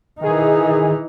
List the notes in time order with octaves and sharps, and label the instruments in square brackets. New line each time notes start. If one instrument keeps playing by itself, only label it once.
[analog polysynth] D#3 G#4 [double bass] E3 D#4